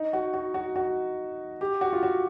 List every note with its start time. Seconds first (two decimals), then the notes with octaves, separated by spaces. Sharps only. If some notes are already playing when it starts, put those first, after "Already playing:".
Already playing: D#4
0.13 F#4
0.34 F#4
0.54 F#4
0.76 F#4
1.61 G4
1.81 F#4
1.93 F4
2.03 F#4